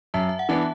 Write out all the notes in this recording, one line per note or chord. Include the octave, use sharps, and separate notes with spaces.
F#2 E5 A5
E5
F#5
E3 B3 D4 E5 A5